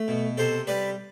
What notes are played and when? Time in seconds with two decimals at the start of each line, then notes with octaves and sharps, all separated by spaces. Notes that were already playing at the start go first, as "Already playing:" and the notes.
Already playing: A3
0.08 B2
0.37 C3 A4 C5
0.67 G3 B4 D5